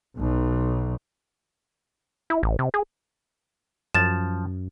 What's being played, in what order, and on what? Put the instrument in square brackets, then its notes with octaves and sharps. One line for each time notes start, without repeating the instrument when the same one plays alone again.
[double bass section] B1
[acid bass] E4
A1
C3
G#4
[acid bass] F#2 [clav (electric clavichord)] F3 [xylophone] A6 E7